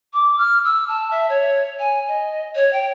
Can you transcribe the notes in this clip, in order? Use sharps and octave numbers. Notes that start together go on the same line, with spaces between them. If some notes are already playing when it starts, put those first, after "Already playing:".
D6
F6
E6
A5
E5
C#5
G#5
D#5
C#5
G5